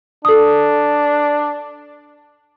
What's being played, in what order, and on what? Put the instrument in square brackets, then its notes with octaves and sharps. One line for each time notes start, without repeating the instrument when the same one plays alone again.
[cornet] D4 [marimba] A4 D#6